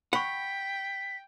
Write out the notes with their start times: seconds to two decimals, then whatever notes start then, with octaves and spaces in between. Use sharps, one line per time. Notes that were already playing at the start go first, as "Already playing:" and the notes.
0.13 F#5 G5 B5 C#6 B6